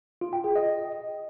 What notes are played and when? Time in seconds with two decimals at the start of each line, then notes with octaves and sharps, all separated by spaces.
0.21 F4
0.33 G5
0.44 G#4
0.56 D#5